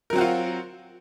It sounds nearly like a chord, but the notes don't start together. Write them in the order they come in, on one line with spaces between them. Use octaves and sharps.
A#4 F#3 C4 F#4 F4